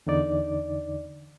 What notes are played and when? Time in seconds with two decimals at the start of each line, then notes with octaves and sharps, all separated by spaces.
0.07 E2 D3 D#4 D5